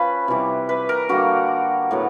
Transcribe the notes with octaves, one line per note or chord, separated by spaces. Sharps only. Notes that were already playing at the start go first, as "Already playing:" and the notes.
Already playing: F3 C#4 B4
C3 E3 G3
B4
A#4
D3 G3 A#3 F#4
A2 F#3 B3